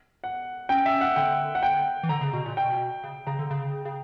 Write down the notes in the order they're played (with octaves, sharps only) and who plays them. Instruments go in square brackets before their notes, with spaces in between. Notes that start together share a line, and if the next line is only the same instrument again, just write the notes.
[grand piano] F#5
[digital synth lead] C#4 [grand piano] G5
[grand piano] E5
F#5
[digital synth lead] D3 [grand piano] G5
[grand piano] F#5
G5
[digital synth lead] E3
[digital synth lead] D3 [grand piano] A#5
[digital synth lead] C#3
B2
A#2
[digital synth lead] B2 [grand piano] G5
[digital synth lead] C#3
[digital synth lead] C#3 [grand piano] A#5
[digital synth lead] D3
C#3
C#3